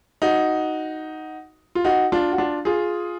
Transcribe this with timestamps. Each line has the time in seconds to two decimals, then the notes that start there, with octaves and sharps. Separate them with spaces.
0.22 D#4 F#4
1.75 F4
1.85 D#4 F#4
2.12 D4 F4
2.32 F#4
2.38 D4 F4
2.65 F4 G#4